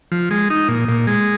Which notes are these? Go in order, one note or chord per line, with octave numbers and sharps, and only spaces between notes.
F3
G#3
D#4
A#2
A#2
G#3